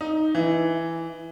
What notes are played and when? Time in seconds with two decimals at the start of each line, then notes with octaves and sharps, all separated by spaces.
0.01 D#4
0.35 E3